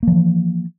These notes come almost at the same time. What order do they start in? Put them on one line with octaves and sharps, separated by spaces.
A#3 F3 E3